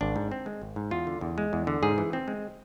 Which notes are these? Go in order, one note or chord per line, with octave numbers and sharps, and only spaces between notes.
G#1 D4
G#2
C4
G#3
G#1
G#2
E2 F4
D3
E2
G#3
E2
D3
G#2 G#4
E3
C4
G#3